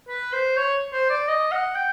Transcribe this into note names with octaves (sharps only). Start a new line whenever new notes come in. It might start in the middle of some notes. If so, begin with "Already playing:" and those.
B4
C5
C#5
C5
D5
D#5
F#5
G5